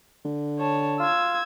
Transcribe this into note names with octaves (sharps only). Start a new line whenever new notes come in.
D3
C#5 A5
F4 E6 G#6